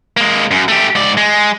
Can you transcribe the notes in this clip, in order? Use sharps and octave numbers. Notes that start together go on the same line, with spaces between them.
G#3 A#3
F#2
A3 G4
G#2 D5
G#3